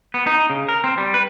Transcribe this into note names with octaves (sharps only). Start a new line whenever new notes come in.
B3
D#4
C#3
A#4
C4
G3
B4